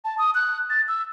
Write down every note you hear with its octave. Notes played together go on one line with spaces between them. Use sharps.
A5
D#6
F#6
A6
E6